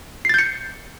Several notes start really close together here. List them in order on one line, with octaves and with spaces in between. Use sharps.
C7 A6 G6 C#7